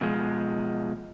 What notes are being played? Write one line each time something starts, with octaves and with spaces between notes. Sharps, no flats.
B2 F3 G#3